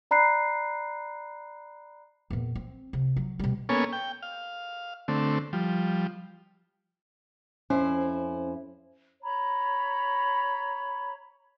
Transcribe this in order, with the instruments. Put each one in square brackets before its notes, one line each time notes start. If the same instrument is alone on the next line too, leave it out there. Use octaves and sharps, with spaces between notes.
[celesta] D5 A#5 B5 F#6 C7
[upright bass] E2 A#2
C4
C3
F#3
B2 G3
[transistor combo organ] A#3 B3 C#4 A4 C#5 G#5
G5
F5
D3 A3 C4
F3 G3
[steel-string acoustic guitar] F2 E4 C5 [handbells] C#4
[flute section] C#5 A#5 B5